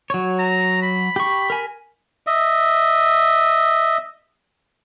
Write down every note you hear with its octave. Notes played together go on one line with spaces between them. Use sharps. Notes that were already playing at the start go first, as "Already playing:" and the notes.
F#3 C#5
A#5
B5
G4 C#6
A#4 G#5
D#5 E5